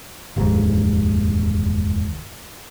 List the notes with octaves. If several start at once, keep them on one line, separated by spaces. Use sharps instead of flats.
F1 D#2 G#2